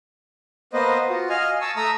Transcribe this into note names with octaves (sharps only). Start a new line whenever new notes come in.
A#3 B3 B4 C5 D#5
F4 F#4
D#5 F5 G#5 F6
A5 C#6 D#6 E6
A3 E5 A#5 D#6 E6